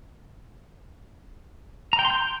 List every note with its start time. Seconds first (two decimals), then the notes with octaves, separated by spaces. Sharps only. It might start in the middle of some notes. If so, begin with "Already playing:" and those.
1.93 A#5
1.99 G5
2.05 C6
2.10 G6